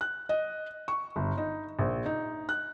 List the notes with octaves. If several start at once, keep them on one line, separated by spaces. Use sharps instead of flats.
F#6
D#5
C#6
G1
D#4
A#1
D#4
F#6